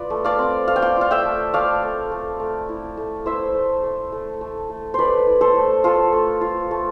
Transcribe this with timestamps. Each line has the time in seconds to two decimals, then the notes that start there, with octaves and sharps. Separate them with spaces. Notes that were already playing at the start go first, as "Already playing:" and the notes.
Already playing: F4 B4 D5
0.10 A3
0.24 D5 F5
0.39 C4
0.67 A3 F5
0.76 G5
0.82 D5 F5
0.97 F4 F5
1.11 E5 G5
1.25 A3
1.54 A3 D5 F5
1.83 A3
2.12 A3
2.40 A3
2.69 E4
2.97 A3
3.26 E4 C5 E5
3.55 A3
3.83 A3
4.12 A3
4.41 A3
4.70 A3
4.94 A3 B4 C5 D5
5.27 E4
5.41 A4 C5
5.55 A3
5.84 A3 F4 A4
6.13 A3
6.41 F4
6.71 A3